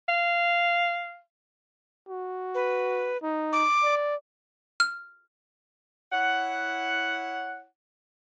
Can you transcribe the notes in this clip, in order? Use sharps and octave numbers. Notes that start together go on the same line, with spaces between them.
F5
F#4
B4
D#4
D6
D5
F6
E4 C#5 F#5